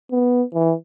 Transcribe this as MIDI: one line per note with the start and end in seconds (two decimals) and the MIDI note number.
0.12 0.43 59
0.54 0.74 52